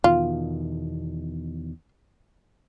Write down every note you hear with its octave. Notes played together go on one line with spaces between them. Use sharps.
E2 B2 D#3 F4